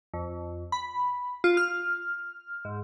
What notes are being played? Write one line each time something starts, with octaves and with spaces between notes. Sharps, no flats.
F2
B5
F4
F6
G#2